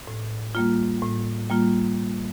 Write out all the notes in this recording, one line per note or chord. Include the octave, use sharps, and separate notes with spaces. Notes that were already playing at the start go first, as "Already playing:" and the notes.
A2
G3 A#3 F4
A2
G3 A#3 F4